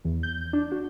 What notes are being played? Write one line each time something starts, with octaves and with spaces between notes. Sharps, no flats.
E2
G6
D4
F#4